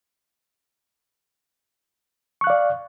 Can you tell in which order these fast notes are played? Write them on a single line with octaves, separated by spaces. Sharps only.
C#6 F#6 F5 D5